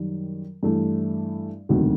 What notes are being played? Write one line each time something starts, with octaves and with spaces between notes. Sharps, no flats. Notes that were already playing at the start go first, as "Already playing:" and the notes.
Already playing: F#2 D#3 G3
G2 E3 A3
E1 D2 C3 D#3 F#3